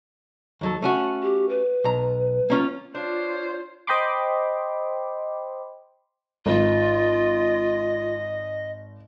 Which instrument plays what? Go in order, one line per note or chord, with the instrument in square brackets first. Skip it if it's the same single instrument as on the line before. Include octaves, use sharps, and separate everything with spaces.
[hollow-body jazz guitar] D#2 F#3 A4
A3 C#4 F#4
[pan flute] G4
B4
[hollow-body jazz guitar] B1 A#5
A#3 C#4 F4
[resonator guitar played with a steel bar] D4 [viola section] F4 [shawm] C5 [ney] C#5
[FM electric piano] C5 D#5 G5 B5 C6 D6
[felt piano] G#1 [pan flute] F4 [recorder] D#5